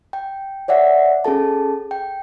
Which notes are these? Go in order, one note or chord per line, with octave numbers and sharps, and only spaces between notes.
G5
C#5 D5 E5 F#5
C#4 G#4 A4 A5
G5